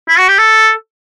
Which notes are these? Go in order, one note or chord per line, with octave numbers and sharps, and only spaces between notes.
E4
F#4
G4
A4